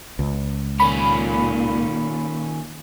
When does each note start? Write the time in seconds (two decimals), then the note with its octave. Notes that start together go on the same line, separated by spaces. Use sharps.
0.19 C#2
0.80 A#2 D#3 C#4 B5